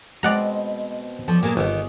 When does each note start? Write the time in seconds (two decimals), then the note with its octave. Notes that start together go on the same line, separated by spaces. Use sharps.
0.23 B2 G#3 C4 D5 F#5 A#5
1.28 F3 A4 C#5 D5
1.43 A#2 F#3 A#3 G#4
1.57 G1 D#3 B3